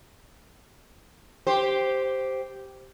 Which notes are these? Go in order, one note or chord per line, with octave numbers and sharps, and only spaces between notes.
G4 C5